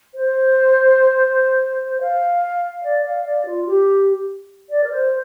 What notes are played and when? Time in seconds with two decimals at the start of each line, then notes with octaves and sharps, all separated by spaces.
0.14 C5
2.01 F5
2.83 D5
3.05 F5
3.25 D5
3.46 F4
3.66 G4
4.70 D5
4.84 A#4
4.90 C5